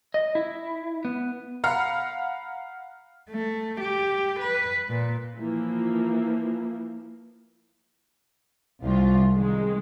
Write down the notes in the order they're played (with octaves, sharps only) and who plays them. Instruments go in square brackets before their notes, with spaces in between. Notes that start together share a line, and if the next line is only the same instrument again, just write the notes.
[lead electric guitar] D#5
E4
B3
[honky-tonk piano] F5 F#5 A#5 B5 F6
[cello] A3
G4
B4
A#2
[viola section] E3 F3 A#3 E4
[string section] C2 F4
D#3 G#3